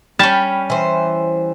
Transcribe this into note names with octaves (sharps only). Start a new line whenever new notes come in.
G3 C#4 G5 A5 B5 F6
E3 C5